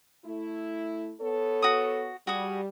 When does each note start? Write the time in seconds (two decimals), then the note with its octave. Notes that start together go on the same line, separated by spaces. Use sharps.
0.25 A3 E4
1.21 B3 A4 C#5
1.62 F#4 D#6
2.27 G3 F#4 G#4